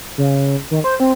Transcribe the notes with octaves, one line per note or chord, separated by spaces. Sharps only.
C#3
D#3
C5
C4